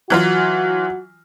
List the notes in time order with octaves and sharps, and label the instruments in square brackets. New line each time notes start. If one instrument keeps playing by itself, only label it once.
[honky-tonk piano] E3 F#3 F4 [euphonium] F#4